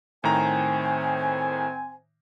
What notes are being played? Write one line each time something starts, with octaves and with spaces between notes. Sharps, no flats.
A2 D#3 C4 G#5 A#5